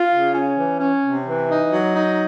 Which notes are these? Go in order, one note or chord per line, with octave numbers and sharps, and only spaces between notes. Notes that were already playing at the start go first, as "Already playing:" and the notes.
Already playing: F4
C#3
C#4
E3
C#4
C3
E3
D#4
F#3
D#4